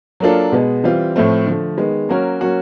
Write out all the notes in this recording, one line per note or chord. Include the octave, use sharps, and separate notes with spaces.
F#3 A#3 D4 F4 A4
B2 G#3 B3
E3 G3 C4 F4
A2 F3 A3 C4
D3 F3 A3
D#3 G#3 B3
F#3 A#3 C#4 F#4 A#4
F#3 A#3 C#4 F#4